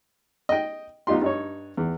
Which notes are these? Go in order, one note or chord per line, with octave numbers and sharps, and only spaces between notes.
D#5 G5
B1 D#4 F4 G4 C6
G2 D#4 C#5
E2